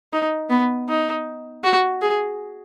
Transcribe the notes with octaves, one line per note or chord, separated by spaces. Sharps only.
D#4
B3
D#4
F#4
G#4